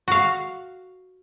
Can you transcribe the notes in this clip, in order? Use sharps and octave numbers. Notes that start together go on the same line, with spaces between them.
F#4 F5